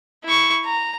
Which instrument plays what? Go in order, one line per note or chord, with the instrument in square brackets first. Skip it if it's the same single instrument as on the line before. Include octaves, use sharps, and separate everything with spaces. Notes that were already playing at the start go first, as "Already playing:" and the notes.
[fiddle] E4 C#6
A#5